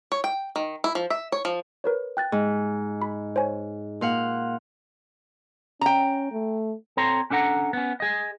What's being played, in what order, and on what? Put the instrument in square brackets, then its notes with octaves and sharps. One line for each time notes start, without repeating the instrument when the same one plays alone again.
[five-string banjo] C#5
G5
D#3
E4
F3
E5
C#5
F3
[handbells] A#4 B4 C#5
G5 F#6 A6
[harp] G#2
[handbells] B5
C5 C#5 G#5
[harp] A#2 F5 F#5
[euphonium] C#4 [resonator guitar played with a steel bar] G5 A#5
[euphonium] A3
[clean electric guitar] C4 A4 C#5 A#5 C6
C#4 D4 A4 F#5 A#5
B3 C#4
G#4 D#5